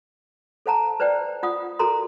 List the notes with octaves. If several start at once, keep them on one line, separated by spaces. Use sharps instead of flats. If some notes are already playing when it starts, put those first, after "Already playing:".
A4 C5 F#5 A5 A#5
B4 C5 D5 G5
F4 F#5 D#6
F#4 A4 A#4 A#5 C6